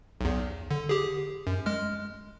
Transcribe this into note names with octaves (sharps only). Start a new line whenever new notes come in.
B1 E2
D3
G4 G#4
F#2
G#3 F6